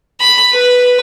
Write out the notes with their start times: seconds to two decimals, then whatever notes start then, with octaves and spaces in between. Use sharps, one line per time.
0.20 B5
0.52 B4